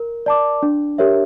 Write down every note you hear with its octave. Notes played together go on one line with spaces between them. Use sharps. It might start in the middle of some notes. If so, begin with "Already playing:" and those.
Already playing: A#4
D5 A5 D6
D4
G4 A#4 C#5 E5